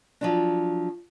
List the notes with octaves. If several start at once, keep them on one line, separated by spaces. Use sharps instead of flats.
F3 F#3 D4